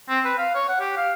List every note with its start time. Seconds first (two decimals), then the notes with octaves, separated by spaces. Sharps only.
0.09 C4
0.25 B4
0.38 F5
0.55 C#5
0.68 F#5
0.80 G4
0.97 F5